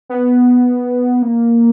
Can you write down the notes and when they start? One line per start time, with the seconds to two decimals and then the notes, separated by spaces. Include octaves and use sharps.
0.09 B3
1.22 A#3